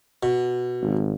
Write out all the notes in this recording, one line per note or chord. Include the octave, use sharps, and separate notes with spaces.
B2
G#1